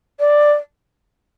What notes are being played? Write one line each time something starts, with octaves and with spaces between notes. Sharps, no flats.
D5